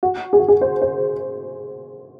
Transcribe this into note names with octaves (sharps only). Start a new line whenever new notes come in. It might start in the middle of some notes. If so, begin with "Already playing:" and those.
F#4
G#4
F#4
G#4
C5
C5